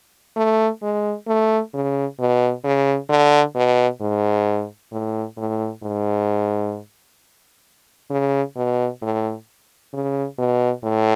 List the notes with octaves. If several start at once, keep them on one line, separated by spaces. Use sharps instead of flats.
A3
G#3
A3
C#3
B2
C#3
D3
B2
G#2
A2
A2
G#2
C#3
B2
A2
C#3
B2
A2